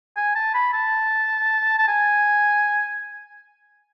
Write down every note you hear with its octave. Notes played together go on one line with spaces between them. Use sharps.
G#5
A5
B5
A5
A5
G#5